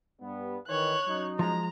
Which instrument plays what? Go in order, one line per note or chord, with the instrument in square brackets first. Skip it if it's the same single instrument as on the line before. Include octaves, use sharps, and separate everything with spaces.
[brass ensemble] G2 B3
[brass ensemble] D#3 E3 [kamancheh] C#5 F#6
[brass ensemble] F#3 C#4 D#4
[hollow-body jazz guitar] F3 G#3 [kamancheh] A#5